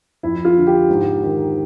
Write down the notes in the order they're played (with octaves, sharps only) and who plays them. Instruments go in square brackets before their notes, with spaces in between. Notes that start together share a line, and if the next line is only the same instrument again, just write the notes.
[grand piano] F2 E4
F4
D3
G4
G#2
D#3